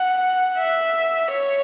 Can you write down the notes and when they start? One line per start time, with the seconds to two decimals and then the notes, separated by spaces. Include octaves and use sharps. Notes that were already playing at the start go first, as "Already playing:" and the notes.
Already playing: F#5
0.58 E5
1.31 C#5